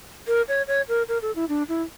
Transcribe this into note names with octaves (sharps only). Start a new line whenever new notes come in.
A#4
C#5
C#5
A#4
A#4
A4
E4
D4
E4